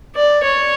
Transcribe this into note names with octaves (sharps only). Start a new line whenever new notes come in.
D5
C#5